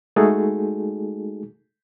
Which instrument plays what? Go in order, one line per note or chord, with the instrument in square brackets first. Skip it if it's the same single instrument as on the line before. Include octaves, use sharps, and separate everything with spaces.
[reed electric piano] G#3 A3 D#4 F#4 G#4 A4